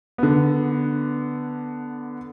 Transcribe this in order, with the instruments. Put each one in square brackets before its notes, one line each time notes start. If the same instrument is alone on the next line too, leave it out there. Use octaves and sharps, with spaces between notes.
[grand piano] D3 B3